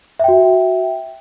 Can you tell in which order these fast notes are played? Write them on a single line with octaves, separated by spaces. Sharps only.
E5 G5 F#4